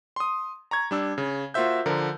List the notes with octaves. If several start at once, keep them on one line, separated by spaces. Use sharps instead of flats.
C6 D#6
A#5 C#6 G#6
G3 D4 E6
C#3
A#3 F4 F#4 C5 E5 G6
D3 F3 A#4